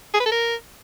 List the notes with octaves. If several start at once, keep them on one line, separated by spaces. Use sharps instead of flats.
G#4
B4
A4
A#4